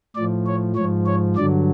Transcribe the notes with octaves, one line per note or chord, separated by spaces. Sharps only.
A2 F3 D5
C#5
G#2 F3 C#5
C#5
G2 D3 F#3 D5